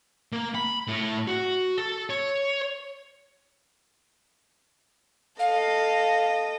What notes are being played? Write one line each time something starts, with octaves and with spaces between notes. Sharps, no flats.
A#3
B5
A2
F#4
A4
C#5
A4 D#5 F5